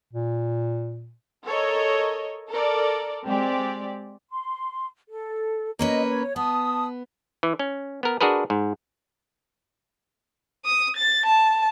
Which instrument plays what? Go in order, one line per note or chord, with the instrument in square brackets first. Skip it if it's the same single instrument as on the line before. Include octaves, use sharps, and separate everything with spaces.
[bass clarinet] A#2
[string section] A4 A#4 C#5 D#5
A4 A#4 D5
G#3 C4 G4 D5
[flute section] C6
A4
[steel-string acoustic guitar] A#3 C#4 B4 [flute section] D#5
[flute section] C#5
[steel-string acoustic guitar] B3 [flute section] A5 D#6
[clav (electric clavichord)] E3
C#4
B3 A#4
D4 F#4 G#4 A#4 B4
G#2
[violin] D#6
A6
A5